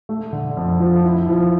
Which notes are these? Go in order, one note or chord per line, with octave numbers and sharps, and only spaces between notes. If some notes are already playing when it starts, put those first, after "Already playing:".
A3
D3
F2
F3
E4
F3